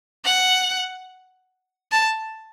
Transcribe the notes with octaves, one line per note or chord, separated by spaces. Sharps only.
F#5
A5